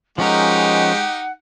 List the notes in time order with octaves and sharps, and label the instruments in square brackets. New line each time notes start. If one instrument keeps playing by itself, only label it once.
[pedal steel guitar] F3 C#4 A#4 [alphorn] G#3 [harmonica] D#4 G4 [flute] F#5